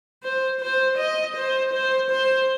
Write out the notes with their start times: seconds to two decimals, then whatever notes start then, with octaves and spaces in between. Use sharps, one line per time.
0.24 C5
0.62 C5
0.99 D#5
1.37 C5
1.74 C5
2.11 C5